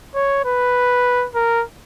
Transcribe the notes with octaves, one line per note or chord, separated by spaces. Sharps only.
C#5
B4
A#4